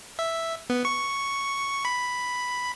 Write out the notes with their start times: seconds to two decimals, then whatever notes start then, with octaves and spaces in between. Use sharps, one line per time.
0.19 E5
0.70 B3
0.85 C#6
1.85 B5